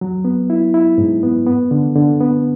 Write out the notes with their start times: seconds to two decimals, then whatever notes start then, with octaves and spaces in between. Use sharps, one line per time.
0.01 F#3
0.25 B3
0.50 E4
0.74 E4
0.98 G#2
1.23 B3
1.47 B3
1.71 D3
1.96 D3
2.21 B3